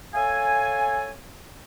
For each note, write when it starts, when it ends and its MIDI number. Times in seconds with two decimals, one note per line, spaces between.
0.14 1.10 69
0.14 1.10 73
0.14 1.10 76
0.14 1.10 77
0.14 1.10 80